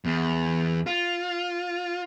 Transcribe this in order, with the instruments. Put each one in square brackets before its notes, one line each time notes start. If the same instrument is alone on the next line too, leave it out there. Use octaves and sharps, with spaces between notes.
[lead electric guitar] E2
F4